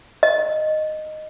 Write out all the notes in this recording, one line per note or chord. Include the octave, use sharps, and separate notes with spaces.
D#5